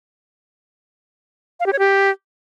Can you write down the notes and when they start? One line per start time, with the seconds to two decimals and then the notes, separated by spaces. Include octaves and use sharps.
1.60 F5
1.66 G4
1.73 C#5
1.79 G4